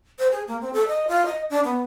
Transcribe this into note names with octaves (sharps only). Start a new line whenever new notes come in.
C5
G#4
A#3
C4
A4
D#5
F4
D#5
D4
B3